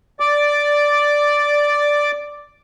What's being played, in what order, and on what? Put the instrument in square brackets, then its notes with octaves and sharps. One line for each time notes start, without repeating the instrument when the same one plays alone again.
[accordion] D5 D6